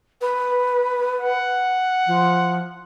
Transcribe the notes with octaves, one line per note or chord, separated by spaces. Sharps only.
B4
F#5
F3